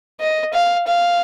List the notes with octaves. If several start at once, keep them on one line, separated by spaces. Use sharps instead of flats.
D#5
F5
F5